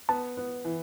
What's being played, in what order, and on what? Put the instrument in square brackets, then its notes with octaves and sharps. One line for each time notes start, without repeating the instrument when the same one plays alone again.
[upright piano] B3 [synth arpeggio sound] A5
[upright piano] B3
E3